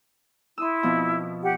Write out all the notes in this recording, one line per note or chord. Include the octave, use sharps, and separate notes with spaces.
E4 C6 D#6 E6
B2 F3 C4
G4 F#5